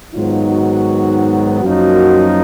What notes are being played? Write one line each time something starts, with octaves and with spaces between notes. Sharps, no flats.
G#2 D#3 F#3 B3 D#4 F4
F#4
F#2 F3 A#3 D#4 F#4